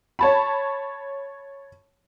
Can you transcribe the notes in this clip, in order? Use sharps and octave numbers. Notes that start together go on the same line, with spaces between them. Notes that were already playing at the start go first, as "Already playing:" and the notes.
C#5 A5 B5